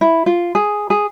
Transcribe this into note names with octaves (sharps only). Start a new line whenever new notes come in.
E4
F4
G#4
G#4